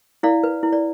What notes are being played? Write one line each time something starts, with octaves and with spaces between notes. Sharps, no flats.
E4 D5 F5
B4
E4
D5